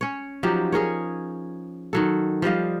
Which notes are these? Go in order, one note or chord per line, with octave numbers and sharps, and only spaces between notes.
C#4 C#5
F3 F#3 D#4 G4
C#4 G#4 A#4 C#5
D#3 F#3 A4
F3 G3 D#5 F5